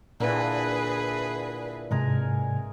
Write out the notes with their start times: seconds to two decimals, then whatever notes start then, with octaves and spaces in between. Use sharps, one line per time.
0.20 A#2 D3 E3 G#4 B4
1.91 G#2 C3 G#3 A#4 G#5